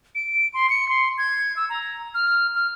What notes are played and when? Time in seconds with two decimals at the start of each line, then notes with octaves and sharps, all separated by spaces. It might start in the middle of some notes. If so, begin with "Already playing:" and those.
0.15 D7
0.54 C6
0.70 C#7
0.89 C6
1.18 G#6
1.56 E6
1.70 A#5
2.14 F6
2.55 F6